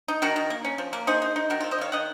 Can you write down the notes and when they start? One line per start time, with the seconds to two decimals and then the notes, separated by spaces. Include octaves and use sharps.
0.08 D#4
0.22 D#3 F#4 A#4
0.36 D#3
0.50 A#3
0.64 C#4
0.78 F3
0.93 A#3
1.07 D#4 G#4 C5
1.22 D#4
1.36 D#4
1.50 D#3 F#4 A#4
1.60 C4 F4
1.71 C5 D#5
1.78 D#3 C#5 F5
1.92 D#3 D#5 F#5